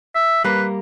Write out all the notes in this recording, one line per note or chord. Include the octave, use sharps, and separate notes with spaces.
E5
G3 A#3 B4